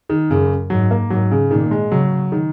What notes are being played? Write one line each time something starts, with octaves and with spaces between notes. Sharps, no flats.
D#3
F#2 C#3
G#2 F#3
A#3
G#2 F#3
C#3
A#2 D#3
G#3
C#3 F#3
D#3